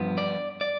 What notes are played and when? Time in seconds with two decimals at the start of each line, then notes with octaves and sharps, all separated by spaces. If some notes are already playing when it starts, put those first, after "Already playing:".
Already playing: G2 F3 B3
0.18 D5
0.61 D5